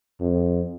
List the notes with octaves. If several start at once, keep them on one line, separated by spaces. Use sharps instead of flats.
F2